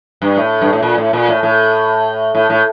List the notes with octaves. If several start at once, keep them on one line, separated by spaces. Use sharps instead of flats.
G2
A2
G2
A2
A#2
A2
A#2
A2
A2
A2
A2